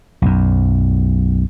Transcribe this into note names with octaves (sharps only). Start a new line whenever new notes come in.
B1 F#2